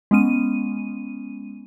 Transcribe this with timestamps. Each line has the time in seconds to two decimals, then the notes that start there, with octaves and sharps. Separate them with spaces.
0.11 G#3 B3 C#4 D#7